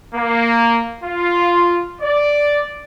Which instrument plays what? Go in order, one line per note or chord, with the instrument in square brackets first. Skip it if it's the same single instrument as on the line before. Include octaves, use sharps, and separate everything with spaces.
[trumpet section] A#3
F4
D5